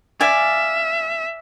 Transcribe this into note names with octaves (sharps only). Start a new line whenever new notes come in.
D5 E5 F5 G#5